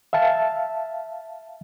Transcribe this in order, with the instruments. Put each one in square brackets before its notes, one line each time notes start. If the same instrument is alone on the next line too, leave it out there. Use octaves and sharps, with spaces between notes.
[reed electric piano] E5 F5 A5